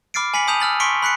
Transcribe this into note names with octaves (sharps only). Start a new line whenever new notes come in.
B5 D6 F6 A6 C7 D7
G#5 B5 B6 C#7 F#7
A5 B5 D#6 G6 D#7 F7
E6 F6 A6 F#7
C6 C#6 B6 C#7 D7 G7
B5 F#6 B6 C#7